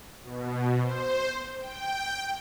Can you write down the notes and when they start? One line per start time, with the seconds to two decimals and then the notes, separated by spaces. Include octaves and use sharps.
0.23 B2
0.82 C5
1.60 G5